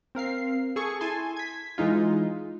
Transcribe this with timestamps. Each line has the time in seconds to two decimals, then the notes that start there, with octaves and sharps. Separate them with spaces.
0.15 C4 A#4 F5 C7
0.76 G#4 A4 G#5 C#6
1.01 E4 G#5 A5 C6
1.37 G#6 B6
1.78 E3 G#3 D#4 F4